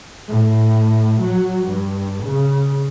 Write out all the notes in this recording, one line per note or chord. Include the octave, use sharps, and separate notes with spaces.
A2
F#3
G2
C#3